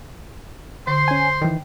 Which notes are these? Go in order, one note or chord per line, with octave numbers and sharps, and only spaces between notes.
D3 C5 C6
C#4 G#5
D#3 E3 G5